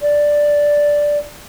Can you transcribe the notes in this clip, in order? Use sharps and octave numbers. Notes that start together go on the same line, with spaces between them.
D5